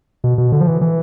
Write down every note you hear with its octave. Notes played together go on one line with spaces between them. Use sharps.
B2
B2
D3
F3
E3
E3